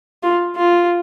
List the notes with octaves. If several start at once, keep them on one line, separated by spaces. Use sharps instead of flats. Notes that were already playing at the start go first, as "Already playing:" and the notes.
F4
F4